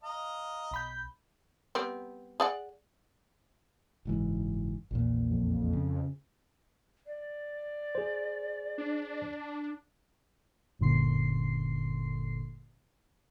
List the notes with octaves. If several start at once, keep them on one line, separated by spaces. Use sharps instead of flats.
D#5 F5 A#5
B1 B5 G6
G3 B3 C4
G#4 D5 F#5
F#1 G#2 E3
A#1 E2 A#2
F2
C#3
D5
G#4 C5
D4
G1 F#2 A#2 D3 C6 C7